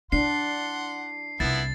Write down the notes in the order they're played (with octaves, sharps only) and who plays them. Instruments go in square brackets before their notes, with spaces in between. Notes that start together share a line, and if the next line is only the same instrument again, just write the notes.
[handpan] D4 [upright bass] E4 [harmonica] F#5 C6 [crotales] C7
[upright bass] C2 [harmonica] F3 B3 E4 [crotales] A6